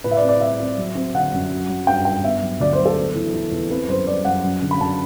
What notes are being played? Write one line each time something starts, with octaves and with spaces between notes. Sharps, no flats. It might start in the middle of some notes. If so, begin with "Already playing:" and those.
A2 B4
E5
D5
C4
D5
C4 E5
C4
F#3
C4
D3 F#5
F#2
F#3
F#3
G2 G5
G2 G5
B3 E5
F#3
D2 D5
C5
F#3
A4
B3
E3
E3
E2
C4 B4
F#2 C5
G3 D5
F#2 F#5
F#2
D3
B5
F#2 A5